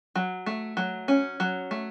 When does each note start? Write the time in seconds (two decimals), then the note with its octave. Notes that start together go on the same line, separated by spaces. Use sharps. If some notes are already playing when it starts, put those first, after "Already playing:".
0.15 F#3
0.46 A3
0.77 F#3
1.08 C#4
1.40 F#3
1.71 A3